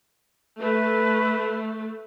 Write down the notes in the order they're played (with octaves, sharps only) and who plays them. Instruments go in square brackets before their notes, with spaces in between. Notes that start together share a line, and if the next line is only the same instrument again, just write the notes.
[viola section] A3 [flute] B4